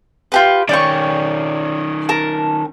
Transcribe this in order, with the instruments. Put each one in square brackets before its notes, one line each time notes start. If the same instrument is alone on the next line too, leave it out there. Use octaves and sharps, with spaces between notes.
[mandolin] F4 G4 B4
[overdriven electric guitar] D#3 C#4 [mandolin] D5 G5 C#6
[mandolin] A#4 A5